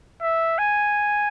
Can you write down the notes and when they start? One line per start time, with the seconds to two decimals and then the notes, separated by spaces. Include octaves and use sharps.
0.22 E5
0.58 G#5